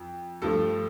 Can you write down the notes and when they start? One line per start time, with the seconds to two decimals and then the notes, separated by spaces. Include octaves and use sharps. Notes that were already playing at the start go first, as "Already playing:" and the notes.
Already playing: F2
0.42 G2 F3 A3 A4